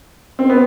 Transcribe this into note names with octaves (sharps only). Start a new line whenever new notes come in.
C4
B3